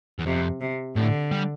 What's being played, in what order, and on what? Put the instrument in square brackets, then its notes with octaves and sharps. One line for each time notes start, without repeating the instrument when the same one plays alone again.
[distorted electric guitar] E2
[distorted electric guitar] F2 [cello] C3
[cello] C3
[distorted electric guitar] A2 [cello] D3
[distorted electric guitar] G3